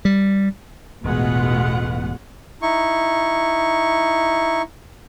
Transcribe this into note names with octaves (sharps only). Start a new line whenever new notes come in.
G3
E1 A1 B2 G#3 F4 F#5
D#4 E4 C#6